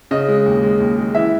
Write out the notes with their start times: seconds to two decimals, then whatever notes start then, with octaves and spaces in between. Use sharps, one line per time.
0.11 C#3 D#5
0.28 G#3
0.46 D#2
0.63 G#3
0.80 D#2
0.98 G#3
1.15 E3 E5